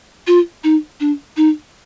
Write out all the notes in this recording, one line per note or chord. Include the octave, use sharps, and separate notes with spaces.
F4
D#4
D4
D#4